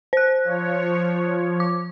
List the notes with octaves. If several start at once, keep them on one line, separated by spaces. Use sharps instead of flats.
C5 F#6
F3 C#5
D6